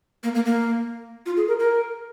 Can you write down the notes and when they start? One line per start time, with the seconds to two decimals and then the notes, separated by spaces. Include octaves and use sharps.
0.23 A#3
0.35 A#3
0.46 A#3
1.26 F4
1.37 G#4
1.48 A#4
1.59 A#4